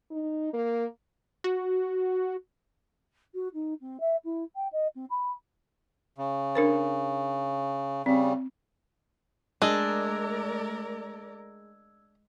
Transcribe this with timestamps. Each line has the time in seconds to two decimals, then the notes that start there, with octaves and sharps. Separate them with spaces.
0.11 D#4
0.53 A#3
1.44 F#4
3.34 F#4
3.54 D#4
3.81 C4
4.00 E5
4.24 E4
4.55 G5
4.72 D#5
4.95 C4
5.10 B5
6.18 C#3
6.55 D4 A#4 C5
8.06 C#3 G3 C4
9.62 G#3 A3 D4 A#4 D5 D#5 E6 G#6